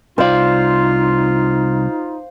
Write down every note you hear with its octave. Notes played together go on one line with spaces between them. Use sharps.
C2 D#4 F4 C5 D5 F5